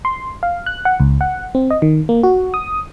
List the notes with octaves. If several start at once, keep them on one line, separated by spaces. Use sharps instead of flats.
C6
F5
F#6
F#5
C#2
F#5
C4
D#5
D#3
A#3
F#4
D#6